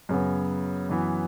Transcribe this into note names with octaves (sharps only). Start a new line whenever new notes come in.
F#2 C#3 F#3 B3
F#2 E3 B3